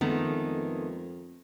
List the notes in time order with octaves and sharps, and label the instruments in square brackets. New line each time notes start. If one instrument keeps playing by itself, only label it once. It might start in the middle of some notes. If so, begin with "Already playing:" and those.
[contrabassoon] F2 [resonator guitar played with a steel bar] D#3 [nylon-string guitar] G#3 A3 B3